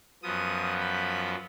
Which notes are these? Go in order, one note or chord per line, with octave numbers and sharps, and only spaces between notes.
F#2 F3 B3 D#6
B5